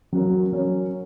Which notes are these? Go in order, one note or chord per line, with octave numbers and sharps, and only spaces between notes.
F#3 C#4 F#4 A#4
F#3 C#4 F#4 A#4